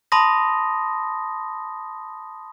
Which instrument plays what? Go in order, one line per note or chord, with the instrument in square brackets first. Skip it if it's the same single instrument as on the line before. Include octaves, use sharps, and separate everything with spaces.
[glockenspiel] A5 B5 C6 D#6 A#6